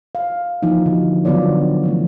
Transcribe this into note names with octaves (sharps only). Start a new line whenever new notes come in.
F5
E3 F3 A#3 D#4
D3 F3 F#4
D3 F#3 B3 F4 C#5 D5
E3 F3 A3